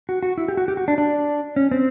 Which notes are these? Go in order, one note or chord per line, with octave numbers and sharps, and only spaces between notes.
F#4
F#4
E4
G4
F#4
G4
F#4
D4
D4
C#4
C4